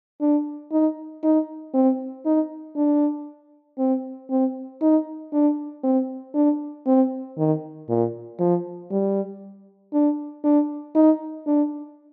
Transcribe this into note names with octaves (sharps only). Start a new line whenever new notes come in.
D4
D#4
D#4
C4
D#4
D4
C4
C4
D#4
D4
C4
D4
C4
D#3
A#2
F3
G3
D4
D4
D#4
D4